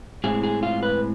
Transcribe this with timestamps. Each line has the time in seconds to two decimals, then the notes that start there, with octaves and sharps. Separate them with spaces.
0.24 A2 G#3 C4 E4 G#4
0.44 G#4
0.63 F4
0.83 B4